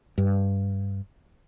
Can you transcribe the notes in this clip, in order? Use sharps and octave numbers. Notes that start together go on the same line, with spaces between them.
G2